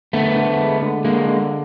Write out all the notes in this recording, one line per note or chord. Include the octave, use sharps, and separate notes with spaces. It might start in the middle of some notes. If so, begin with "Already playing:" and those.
D3 A3 B3
D3
G#3
D3
D3 G#3 A#3
D3